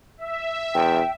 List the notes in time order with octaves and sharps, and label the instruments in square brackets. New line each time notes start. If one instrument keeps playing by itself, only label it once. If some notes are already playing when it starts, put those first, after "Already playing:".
[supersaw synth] E5
[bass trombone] E2 [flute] G5